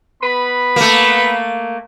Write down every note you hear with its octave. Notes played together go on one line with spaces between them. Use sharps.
B3 B4 B5
A3 A#3